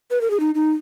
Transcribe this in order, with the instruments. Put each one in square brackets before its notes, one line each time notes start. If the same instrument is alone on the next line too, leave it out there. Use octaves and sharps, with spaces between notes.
[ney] B4
A#4
G#4
D#4
D#4